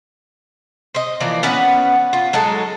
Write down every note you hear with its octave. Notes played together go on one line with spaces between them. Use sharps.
C5 D#5
E3 F3 A#3 D5
B3 C#4 B4 F#5
F4
F#3 G#3 D#4 A4